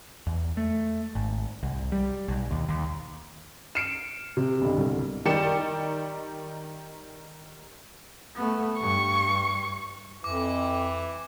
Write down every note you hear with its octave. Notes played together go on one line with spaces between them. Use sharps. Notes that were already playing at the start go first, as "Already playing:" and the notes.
E2
A3
G#1
C2
G3
B1
D#2
D#2
F6 C#7 D7 E7
C3
B1 G2 D3
C2
D#3 G3 D5 G5 C#7 E7
A3 B3
G2 C#6
F2 E3 D6